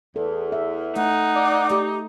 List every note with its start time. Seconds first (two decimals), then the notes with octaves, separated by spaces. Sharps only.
0.16 E2 A4
0.52 E5
0.96 A3 D#4 F#5
1.35 D5
1.70 A3 G4